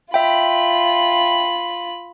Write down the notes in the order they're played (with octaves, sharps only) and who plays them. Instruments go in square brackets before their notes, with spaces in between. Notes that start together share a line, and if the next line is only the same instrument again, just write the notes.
[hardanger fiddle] F4 B5 [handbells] E5 G5